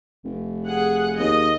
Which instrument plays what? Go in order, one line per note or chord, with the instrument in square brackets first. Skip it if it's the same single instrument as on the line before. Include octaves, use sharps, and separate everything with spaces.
[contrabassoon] F1
[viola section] G#4 F#5
[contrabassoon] D#2 [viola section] D#5